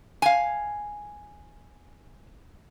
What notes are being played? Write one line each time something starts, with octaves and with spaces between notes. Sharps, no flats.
F5 G#5